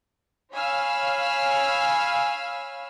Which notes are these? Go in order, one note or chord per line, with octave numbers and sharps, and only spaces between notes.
C#5 F5 G#5 B5 E6 F6